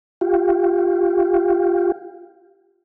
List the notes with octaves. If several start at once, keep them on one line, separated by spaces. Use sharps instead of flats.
F4 G4